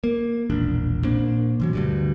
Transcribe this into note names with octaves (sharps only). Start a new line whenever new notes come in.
A#3
E1 A#1 D4
A#2 A#3 C4 D4
B2 E3 F#3
D2 G2 D3